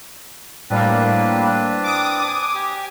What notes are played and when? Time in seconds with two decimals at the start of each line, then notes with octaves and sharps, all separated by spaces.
0.70 A2 G3 A#3 C4 D4 B4
1.83 D6 D#6
2.28 G#5
2.55 G4 G#5